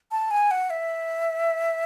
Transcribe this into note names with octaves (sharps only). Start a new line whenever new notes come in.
A5
G#5
F#5
E5